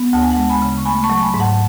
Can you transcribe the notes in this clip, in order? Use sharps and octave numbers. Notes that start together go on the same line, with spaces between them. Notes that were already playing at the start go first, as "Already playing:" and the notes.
Already playing: B3
D2 A5
G#5
F#5 A5
G#3
G#5 B5
C#3
C#6
A3 G#5 B5
A5 C#6
F#3
G#5 B5
G#2
F#5 A5